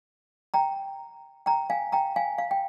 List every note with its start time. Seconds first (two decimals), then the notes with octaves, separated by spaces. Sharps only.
0.54 G5 A#5
1.46 G5 A#5
1.70 F5 G#5
1.92 G5 A#5
2.16 F5 G#5
2.38 F5
2.51 G5